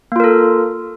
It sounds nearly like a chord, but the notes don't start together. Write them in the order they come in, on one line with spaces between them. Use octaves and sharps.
A#3 F4 A#4 A4